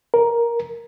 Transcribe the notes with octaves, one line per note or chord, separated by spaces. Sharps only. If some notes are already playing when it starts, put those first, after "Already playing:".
A#4